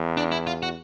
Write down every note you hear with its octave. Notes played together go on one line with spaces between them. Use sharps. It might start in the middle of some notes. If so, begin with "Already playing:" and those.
Already playing: E2
D4
E4
F4
F#4